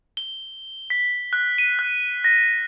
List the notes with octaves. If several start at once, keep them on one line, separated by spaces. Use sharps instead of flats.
G7
B6
F#6
D#7
F#6
A#6